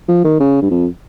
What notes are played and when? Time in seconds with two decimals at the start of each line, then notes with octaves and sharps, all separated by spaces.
0.08 F3
0.25 D#3
0.40 C#3
0.62 G2
0.71 F2